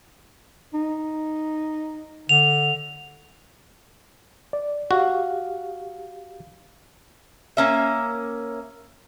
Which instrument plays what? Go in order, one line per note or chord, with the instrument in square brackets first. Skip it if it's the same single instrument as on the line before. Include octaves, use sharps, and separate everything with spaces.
[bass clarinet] D#4
[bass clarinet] D3 [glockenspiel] F7
[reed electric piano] D5
[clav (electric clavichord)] F#4 [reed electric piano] G4 F5
[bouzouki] A#3 C#4 E5